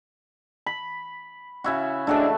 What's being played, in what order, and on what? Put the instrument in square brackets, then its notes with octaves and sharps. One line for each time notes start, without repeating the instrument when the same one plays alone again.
[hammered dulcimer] B5
C#3 E4 F#4
[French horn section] A2 G#3 D4 [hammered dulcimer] A3 F#4 A4